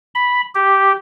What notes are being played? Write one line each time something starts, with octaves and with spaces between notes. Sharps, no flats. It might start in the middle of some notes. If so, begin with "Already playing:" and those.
B5
G4